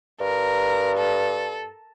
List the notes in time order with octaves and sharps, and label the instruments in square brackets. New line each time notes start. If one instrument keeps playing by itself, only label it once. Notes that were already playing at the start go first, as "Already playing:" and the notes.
[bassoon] G2 [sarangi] A#4
[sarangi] A4